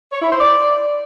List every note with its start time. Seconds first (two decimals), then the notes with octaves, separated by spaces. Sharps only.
0.12 C#5
0.21 E4
0.31 C5
0.40 D5